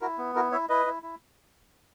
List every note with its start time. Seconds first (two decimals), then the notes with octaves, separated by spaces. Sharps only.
0.02 E4 F#4 A#4
0.18 B3
0.35 E4 F#4 A#4
0.52 E4 C#5 E5
0.69 E4 B4 D#5
0.86 E4
1.03 E4